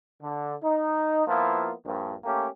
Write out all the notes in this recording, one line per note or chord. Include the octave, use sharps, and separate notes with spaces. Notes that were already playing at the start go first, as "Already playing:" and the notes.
D3
D#4
F3 A#3 B3 E4 F4
A#1 G2
A3 A#3 C#4 G4